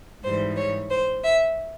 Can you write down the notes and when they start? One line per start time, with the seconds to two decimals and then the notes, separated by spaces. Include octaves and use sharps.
0.23 G#2 E3 G3 C5
0.56 C#5
0.90 C5
1.23 E5